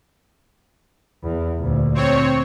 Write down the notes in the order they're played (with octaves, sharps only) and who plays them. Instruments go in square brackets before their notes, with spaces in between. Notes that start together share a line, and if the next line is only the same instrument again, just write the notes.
[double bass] E2
D2 A#2
[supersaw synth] C4 C#5